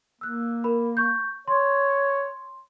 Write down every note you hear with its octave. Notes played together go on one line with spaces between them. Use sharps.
A#3 E6 F#6
A#4 B5
C#6 G6
C#5 C6